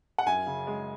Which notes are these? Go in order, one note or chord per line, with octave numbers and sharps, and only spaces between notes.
F#5
F#2 G#5
C#3
G#3